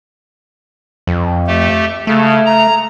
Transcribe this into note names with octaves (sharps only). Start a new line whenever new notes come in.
F2
A3 G4
C#3 A3
A#5